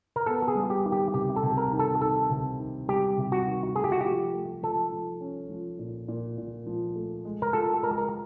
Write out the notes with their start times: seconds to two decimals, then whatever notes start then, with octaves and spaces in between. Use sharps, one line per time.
0.16 A#4
0.26 B3 A4
0.48 G#4
0.55 G3
0.70 G4
0.85 D#3
0.92 G4
1.14 C3 G4
1.36 A4
1.43 C3
1.57 A#4
1.72 D#3
1.79 A4
2.01 D#3 A4
2.30 C3
2.59 D#3
2.88 G3 G4
3.18 C3
3.32 F#4
3.46 D#3
3.75 A3 G#4
3.84 G4
3.92 F#4
4.01 F3 G4
4.34 A3
4.63 F3 A4
4.92 F3
5.21 C#4
5.50 F3
5.79 A#2
6.08 A#2
6.38 A#2
6.66 F3
6.96 A3
7.25 G#3
7.42 A#4
7.53 F4 A4
7.83 G#3 A#4
7.98 A#4